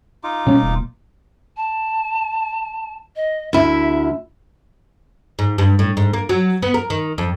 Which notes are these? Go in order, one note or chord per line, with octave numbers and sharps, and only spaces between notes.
D#4 F4 D6
B2 G3 A#3 C#4
D#1
A5
D#5
D2 E4 E5
G#2
G2
A2
G#2
A#3
F#3
B3
A#4
D#3
F2